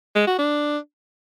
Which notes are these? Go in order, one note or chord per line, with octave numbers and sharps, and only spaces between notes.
G#3
F#4
D4